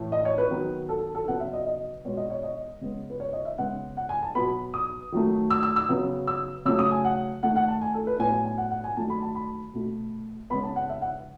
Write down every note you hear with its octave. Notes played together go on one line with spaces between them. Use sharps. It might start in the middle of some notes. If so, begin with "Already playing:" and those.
Already playing: A2 E3 A3
D#5
C#5
B4
D#3 F#3 B3
A4
A4
A4
C#3 F#3 B3 F#5
E5
D#5
D#5
B2 G#3 B3 C#5
D#5
C#5
D#5
C#3 G#3 B3
B4
C#5
D#5
E5
C#3 G#3 B3 F#5
F#5
G#5
A5
B2 F#3 B3 B5
D#6
D#3 F#3 A3
E6
E6
E6
C#3 F#3 B3
E6
C#3 F#3 A3 E6
D#6
G#5
F#5
D#3 A3 F#5
F#5
A5
G#5
A4
B4
A2 F#3 B3 G#5
G#5
G#5
F#5
F#5
G#5
D#3 F#3 A3 A5
B5
A5
B5
B2 A3
C#3 G#3 B3 B5
A5
F#5
E5
F#5